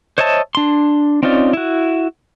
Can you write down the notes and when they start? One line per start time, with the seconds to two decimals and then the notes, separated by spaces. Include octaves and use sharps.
0.18 C5 C#5 D#5 E5 A5
0.55 D4 C6
1.23 C4 C#4 D#4 F4 D5
1.53 E4 F#4